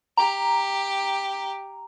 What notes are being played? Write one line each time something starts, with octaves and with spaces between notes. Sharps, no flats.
G4 A#5